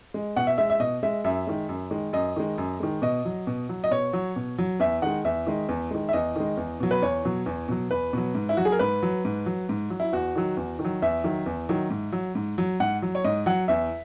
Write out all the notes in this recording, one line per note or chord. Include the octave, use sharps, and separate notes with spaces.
G#3
B2 F#5
E5
G#3 E5
E5
B2 D#5
G#3 E5
F#2 E5
D#3 G#3
F#2
D#3 G#3
F#2 D#5
D#3 G#3
F#2
D#3 G#3
B2 D#5
F#3
B2
F#3
D#5
B2 C#5
F#3
B2
F#3
E2 E5
D#3 G#3 F#5
E2 E5
D#3 G#3
E2
D#3 G#3
E5
E2 D#5
D#3 G#3
E2
B2 F#3
B4
E2 C#5
B2 F#3
E2
B2 F#3
E2 B4
B2 F#3
G#2
E4
F#3 F#4
G#4
A#4
G#2 B4
F#3
G#2
F#3
G#2
F#3
E4
E2 F#4
D#3 F#3
E2
D#3
F#3
E2 E5
D#3 F#3
E2
D#3 F#3
G#2
F#3
G#2
F#3
G#2 F#5
F#3
C#5
G#2 D#5
F#3 F#5
E2 E5